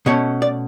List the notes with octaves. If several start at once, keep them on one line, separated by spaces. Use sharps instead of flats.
B2 A3 C#4 C#5
D5